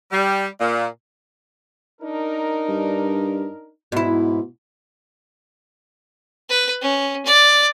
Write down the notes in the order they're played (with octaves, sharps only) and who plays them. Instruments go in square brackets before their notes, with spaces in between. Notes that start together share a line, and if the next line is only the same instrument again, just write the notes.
[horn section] G3
A#2
[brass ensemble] D4 D#4 A#4
[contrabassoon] G2
[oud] G#2 E4 [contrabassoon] B2
[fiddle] B4
C#4
D5